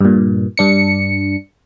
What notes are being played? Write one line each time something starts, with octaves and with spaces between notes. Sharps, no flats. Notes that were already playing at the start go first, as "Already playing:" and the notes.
G2 A#2
G2 D4 C#7